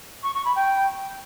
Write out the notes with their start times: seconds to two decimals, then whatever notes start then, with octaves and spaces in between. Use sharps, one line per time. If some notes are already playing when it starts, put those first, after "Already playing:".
0.23 C#6
0.34 C#6
0.45 B5
0.56 G5